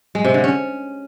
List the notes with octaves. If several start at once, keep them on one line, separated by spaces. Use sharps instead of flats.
G#3
C3
D3
C#4